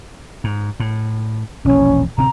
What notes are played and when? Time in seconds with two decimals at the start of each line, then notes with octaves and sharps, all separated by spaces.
0.44 G#2
0.80 A2
1.65 E1 A#1 C#4
2.18 D1 C3 C4 A#5